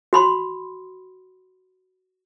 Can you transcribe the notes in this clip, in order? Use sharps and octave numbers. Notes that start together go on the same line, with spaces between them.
F#4 B5 C6